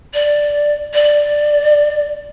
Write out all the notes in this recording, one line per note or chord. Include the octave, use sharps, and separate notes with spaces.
D5
D5